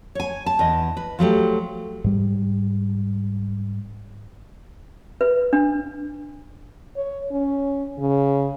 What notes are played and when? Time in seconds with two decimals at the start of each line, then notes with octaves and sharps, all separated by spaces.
0.15 C#5 G#5
0.46 A5
0.59 E2 D#5
0.97 B4
1.19 F3 F#3 A3 G4
2.04 G#2 G3
5.21 B4
5.53 D4
6.97 C#5
7.31 C#4
7.98 C#3